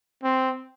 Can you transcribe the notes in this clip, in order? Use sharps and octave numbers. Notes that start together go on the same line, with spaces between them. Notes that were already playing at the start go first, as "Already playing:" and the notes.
C4